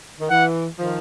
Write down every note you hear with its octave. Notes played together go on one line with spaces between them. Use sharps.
D#3
E3 F#5
D#3 F3